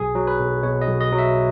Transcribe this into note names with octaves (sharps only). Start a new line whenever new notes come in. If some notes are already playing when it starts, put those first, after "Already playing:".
Already playing: B1 G#4
F#3
B4
B1
B2 C#5
D#5
B1
D#5
F#3
E5